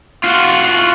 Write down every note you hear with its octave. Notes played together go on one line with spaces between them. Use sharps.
F4 F#4